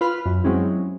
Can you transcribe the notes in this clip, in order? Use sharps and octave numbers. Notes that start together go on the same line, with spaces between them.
F4 B4 B5 F6
F#2
F#3 G#3 C4 C#4 E4